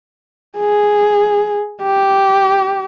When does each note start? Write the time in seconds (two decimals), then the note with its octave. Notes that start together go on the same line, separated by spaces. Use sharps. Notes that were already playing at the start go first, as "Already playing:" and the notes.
0.58 G#4
1.83 G4